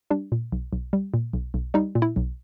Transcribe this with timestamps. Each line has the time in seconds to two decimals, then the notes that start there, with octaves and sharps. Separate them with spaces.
0.10 G3 D4
0.32 A#2
0.52 B1
0.73 B1
0.93 G3
1.14 A#2
1.33 B1
1.54 B1
1.74 G3 D#4
1.95 A#2
2.02 E4
2.16 B1